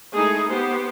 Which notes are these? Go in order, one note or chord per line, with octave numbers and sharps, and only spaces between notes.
G#3 A3 D#4 E4 G#4
B3 G4 C5